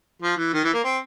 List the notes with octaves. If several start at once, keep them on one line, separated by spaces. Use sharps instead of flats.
F3
E3
D#3
E3
A#3
C4